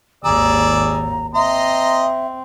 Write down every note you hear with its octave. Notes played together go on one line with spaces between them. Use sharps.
G#1 D#2 G#4 D5 A#5 E6
C4 D#5 E5 A#5 C6